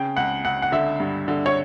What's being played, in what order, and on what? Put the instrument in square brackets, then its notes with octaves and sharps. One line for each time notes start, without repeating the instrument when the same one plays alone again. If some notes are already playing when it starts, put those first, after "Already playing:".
Already playing: [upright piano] C#3 G5
C#2 F#5
C#2 F#5
F#5
D3 E5
G2
D3
C#5